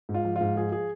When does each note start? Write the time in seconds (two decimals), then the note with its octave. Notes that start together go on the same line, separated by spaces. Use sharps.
0.09 G#2
0.14 F4
0.25 F3
0.36 G#2 F4
0.56 F3 G#4
0.72 G#4